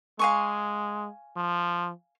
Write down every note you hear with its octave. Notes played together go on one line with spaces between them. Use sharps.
G#3 F5 G#5 C#6
F3